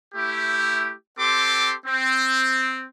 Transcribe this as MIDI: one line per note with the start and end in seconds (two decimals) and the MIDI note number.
0.14 0.93 57
0.14 0.93 64
0.14 0.93 67
1.18 1.74 60
1.18 1.74 67
1.18 1.74 69
1.18 1.74 84
1.18 1.74 86
1.86 2.84 60